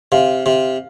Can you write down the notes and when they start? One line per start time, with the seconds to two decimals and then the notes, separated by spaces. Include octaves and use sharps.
0.12 C3 F5
0.46 C3